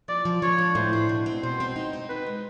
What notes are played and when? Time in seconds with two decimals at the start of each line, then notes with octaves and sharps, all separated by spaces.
0.08 F3 D5
0.25 F3
0.42 F3 C#5
0.58 D4
0.75 A2 C5
0.93 D4
1.09 B2
1.26 C4
1.43 B2 C5
1.60 C4
1.76 D#4
1.93 C4
2.09 D#4 B4
2.26 G#3